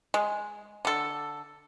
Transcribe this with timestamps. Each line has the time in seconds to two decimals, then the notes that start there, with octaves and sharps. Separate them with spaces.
0.14 G#3
0.85 D3 A4